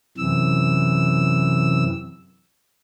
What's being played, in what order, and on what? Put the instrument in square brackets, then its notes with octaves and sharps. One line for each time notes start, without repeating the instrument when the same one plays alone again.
[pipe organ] F#2 C3 E3 E6